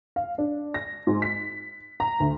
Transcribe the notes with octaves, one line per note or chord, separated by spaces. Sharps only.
F5
D4
A#6
G#2
B6
A#5
D2